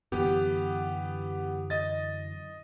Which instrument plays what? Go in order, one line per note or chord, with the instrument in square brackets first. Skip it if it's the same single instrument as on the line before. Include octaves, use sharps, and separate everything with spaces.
[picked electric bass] F#2 D3 E3 [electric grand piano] B3 G4
[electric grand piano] D#5 A6